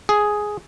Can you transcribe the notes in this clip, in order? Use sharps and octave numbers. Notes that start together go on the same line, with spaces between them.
G#4